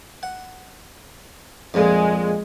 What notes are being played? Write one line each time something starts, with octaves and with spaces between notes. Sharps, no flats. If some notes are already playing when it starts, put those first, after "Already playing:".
F#5
F2 A#2 G#3